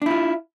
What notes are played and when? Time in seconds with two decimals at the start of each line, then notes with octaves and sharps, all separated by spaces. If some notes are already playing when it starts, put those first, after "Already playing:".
0.02 D4
0.06 E4
0.11 F4